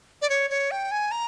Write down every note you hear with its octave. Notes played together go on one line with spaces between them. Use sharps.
D5
C#5
C#5
G5
G#5
A#5